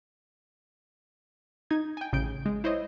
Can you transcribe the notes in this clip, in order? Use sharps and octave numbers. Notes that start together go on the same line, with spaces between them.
D#4 G#6
G5 G#5
A1 C#3 G6 D7
G#3
E4 C5 C#5 D#5